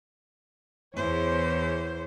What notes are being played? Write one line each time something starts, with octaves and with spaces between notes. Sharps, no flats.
E2 C5 C#5